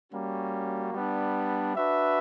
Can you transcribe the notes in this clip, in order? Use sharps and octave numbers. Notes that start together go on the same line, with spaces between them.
G3 A#3 C#4 F#4
G3 B3 D4
D4 F#4 B4 E5